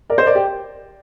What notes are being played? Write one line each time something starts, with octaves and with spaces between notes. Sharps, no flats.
A#4 D5
C5 D#5
A#4 D5
G4